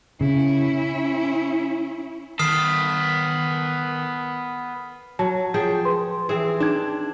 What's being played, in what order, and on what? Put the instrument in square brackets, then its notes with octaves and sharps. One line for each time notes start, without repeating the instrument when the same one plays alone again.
[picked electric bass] C#3 [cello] C#4 E4
[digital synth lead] D#3 [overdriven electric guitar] B3 A4 [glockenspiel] D#6 F6 C7
[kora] F#3 [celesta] A5
[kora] F3 G#4 G5
[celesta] B4 C6
[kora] E3 C4 G#4
[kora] D4 [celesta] D#4 G#6